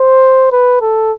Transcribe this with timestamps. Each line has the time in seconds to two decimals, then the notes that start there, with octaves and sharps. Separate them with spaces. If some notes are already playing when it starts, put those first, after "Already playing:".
Already playing: C5
0.52 B4
0.81 A4